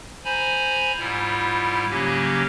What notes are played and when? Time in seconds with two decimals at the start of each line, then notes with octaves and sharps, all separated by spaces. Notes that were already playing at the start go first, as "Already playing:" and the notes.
0.25 C5 G#5 A#5 B5
0.98 G#2 G3 E4 F4
1.90 C#3 F#3 A#3 C#4 G4